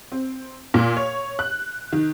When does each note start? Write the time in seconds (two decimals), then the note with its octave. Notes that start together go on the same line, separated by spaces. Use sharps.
0.12 C4
0.74 A#2
0.97 C#5
1.39 F#6
1.92 D#3